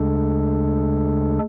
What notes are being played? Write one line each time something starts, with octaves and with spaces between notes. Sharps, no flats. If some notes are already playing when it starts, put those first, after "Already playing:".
Already playing: D2 C#3 G#3 D4 A4